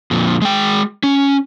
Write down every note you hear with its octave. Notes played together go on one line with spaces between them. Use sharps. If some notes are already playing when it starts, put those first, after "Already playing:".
F2 A#2
G#3 G5
C#4